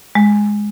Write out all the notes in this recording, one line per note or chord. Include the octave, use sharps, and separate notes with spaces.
G#3